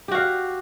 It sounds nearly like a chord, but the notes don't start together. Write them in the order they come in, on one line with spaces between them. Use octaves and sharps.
G4 F#4 F5